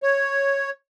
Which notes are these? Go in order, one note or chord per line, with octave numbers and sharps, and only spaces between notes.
C#5